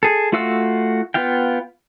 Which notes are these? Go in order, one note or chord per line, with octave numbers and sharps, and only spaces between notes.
G#4 A4
A3 F4 F#4 F5 E6
B3 F4 F5 G5